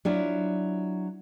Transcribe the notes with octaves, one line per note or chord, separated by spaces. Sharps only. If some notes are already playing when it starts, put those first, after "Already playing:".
F#3 D4 E4 F4